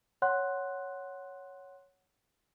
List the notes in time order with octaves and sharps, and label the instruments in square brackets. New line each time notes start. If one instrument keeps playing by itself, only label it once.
[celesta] C#5 F#5 C6 F#6